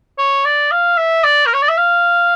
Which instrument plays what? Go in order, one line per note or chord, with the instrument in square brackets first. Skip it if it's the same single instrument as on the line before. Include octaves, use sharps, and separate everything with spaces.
[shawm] C#5
D5
F5
E5
D5
A#4
C#5
D5
E5
F5